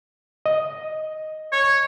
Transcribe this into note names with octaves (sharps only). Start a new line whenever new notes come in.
D#5
C#5